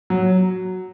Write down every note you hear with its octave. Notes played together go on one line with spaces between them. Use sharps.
F#3